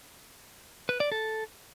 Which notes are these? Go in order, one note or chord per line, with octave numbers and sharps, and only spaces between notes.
B4
D5
A4